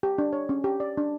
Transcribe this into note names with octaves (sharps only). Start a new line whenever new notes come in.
G4
D4
C#5
C#4
G4
D5
D4